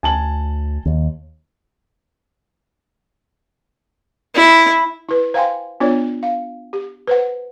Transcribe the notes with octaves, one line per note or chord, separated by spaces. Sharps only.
D2 G#5 A5 F#7
D#2
E4
E4 B4
C5 F5 G5 G#5 C6
B3 D4 F4 C#5 D5
F5
G4
B4 C5 F#5